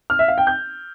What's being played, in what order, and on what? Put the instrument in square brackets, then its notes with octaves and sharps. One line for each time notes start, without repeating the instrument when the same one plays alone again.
[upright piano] F6
E5
F5
G5
G6